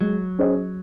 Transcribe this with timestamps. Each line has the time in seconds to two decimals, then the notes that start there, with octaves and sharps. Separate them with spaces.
0.01 F#3 G#3
0.39 C#4 G#4 C5 D#5